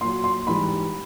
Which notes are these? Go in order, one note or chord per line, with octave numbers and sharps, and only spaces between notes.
A#2 F#3 C6
C6
G#2 E3 G3 B5